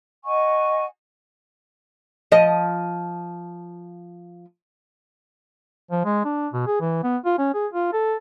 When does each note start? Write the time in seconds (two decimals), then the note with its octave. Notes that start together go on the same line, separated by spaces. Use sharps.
0.25 D#5 F#5 G#5 C#6
2.32 F3 D#5
5.91 F3
6.05 G#3
6.25 D4
6.53 B2
6.67 G#4
6.81 E3
7.04 B3
7.25 F4
7.38 C#4
7.54 G#4
7.74 F4
7.93 A4